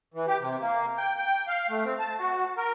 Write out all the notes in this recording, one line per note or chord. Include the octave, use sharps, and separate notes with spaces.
E3
G4
C3
A#3
G5
G5
F5
A3
C4
A5
F#4
A#4